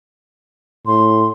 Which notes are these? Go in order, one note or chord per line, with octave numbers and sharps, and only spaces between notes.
A2 C6